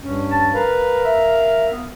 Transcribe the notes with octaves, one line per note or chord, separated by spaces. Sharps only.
G2 C#4
A5
A#4 B4 F5 A#5
E5
B3